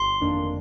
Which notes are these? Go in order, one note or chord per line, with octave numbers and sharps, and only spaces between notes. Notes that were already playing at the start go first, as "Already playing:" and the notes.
Already playing: G1 C6
F2 D#3 A#3 D4